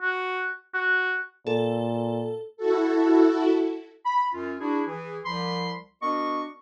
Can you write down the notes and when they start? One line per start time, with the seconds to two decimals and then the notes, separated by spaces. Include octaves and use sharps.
0.02 F#4
0.74 F#4
1.47 A#2 A4
2.57 E4 F#4 A4
4.05 B5
4.34 F#2 C#4 F4
4.60 D4 E4 F#4 G#4
4.87 E3 G#4
5.25 C2 F3 B5 C6
6.02 B3 D4 F#4 A#4 D#5 C#6